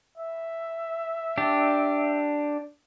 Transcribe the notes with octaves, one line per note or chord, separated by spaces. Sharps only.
E5
D4 G4